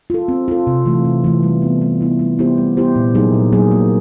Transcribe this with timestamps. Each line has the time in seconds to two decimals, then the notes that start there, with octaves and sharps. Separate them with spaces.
0.10 F4 A4
0.28 C4
0.48 F4 A4
0.67 C3
0.86 E3 A3
1.05 C3
1.24 E3 A3
1.43 G3
1.62 B3 E4
1.82 G3
2.00 B3 E4
2.19 G3
2.39 B3 E4 G4 C5
2.58 G3
2.77 B3 E4 G4 C5
2.96 A#2
3.15 F#3 A#3 D#4 G#4
3.34 A#2
3.53 F#3 A#3 D#4 G#4
3.71 A#3